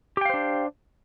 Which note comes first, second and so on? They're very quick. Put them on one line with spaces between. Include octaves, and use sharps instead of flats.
G4 G5 F5 C5 D4